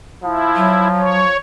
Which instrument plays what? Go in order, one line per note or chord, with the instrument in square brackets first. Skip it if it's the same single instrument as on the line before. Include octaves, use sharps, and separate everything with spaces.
[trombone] F3 [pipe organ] E4
[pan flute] F#3
[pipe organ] C#5